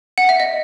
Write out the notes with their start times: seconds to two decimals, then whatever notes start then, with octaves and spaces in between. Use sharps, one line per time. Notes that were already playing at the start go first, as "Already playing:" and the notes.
0.18 F#5
0.29 E5
0.40 D#5